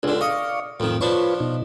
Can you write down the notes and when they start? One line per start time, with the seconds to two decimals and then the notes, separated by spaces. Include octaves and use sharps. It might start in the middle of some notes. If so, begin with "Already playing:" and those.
0.03 C#2 D3 D4 G#4
0.21 D5 D#5 F5 C#6
0.80 F2 A2 D#3
1.01 F3 D4 F4 B4 C#5 C#6
1.40 B2 D#4